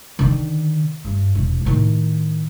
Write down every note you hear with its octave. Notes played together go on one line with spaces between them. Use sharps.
D3 D#3
G2
E1
A2 D#3